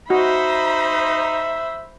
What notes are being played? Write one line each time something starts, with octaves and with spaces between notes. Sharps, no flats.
D#4 F#4 C5 E5 B5